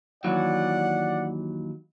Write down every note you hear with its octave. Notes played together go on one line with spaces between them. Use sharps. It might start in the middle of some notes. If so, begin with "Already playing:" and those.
D#2 E3 F#3 D5 F#5